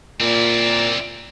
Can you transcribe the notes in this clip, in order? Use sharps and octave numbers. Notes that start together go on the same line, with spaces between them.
A#2 C4 E4 D5